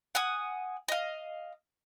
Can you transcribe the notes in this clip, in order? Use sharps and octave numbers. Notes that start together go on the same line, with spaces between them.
F#5 G#5 D#6
D#5 F5